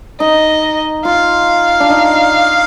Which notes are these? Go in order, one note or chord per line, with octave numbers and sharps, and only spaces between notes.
D#4 D#5
F4 F5
D4
D#4